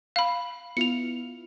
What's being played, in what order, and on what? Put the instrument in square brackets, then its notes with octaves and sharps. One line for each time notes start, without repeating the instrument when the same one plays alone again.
[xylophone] F5 B5
[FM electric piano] B3 E4 F4 [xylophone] C#7 F7